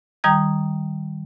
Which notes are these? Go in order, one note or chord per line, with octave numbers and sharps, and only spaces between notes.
D#3 G3 G5 A#5 D#6 G#6